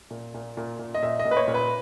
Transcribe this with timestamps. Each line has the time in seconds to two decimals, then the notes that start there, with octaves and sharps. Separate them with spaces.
0.11 A#2
0.34 A#2
0.57 A#2
0.79 A#2
0.94 D#5
1.02 A#2 E5
1.19 D#5
1.25 A#2
1.31 B4
1.37 C#5
1.48 A#2
1.54 B4